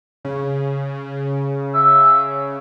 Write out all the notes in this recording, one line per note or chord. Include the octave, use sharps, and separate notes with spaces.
C#3
E5